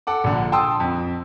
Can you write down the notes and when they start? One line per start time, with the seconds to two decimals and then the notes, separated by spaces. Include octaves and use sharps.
0.07 A4 F#5 D6
0.24 A#1 D3
0.52 G5 A5 C6 D#6 E6
0.80 F2